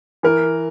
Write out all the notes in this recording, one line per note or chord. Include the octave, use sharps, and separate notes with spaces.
E3 A#4